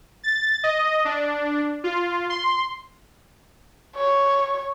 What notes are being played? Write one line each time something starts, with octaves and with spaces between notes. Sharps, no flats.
A6
D#5
D4
F4
C6
C#5